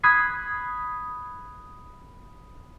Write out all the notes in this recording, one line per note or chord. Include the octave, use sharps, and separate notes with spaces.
B5 D#6 F#6 G#6 B6 C7